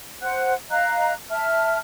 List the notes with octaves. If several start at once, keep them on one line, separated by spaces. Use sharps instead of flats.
C5 F#5 F#6
D#5 F5 A#5 F#6
E5 A5 F6